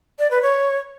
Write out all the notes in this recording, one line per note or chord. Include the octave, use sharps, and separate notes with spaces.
D5
B4
C#5